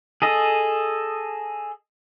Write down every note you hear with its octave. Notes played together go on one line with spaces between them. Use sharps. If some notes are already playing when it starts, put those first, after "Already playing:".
G#4 A4 D#5